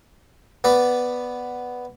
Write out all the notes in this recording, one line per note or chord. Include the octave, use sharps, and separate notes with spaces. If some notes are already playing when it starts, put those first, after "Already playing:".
B3 B4 D5